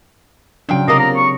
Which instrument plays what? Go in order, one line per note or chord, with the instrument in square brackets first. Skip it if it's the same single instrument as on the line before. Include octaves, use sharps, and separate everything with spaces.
[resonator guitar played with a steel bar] F2 G5 [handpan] C#3 F#3 D4
[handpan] C3 [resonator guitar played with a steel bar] A#3 F4 A#4 [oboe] D#5
[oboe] A#5
C#6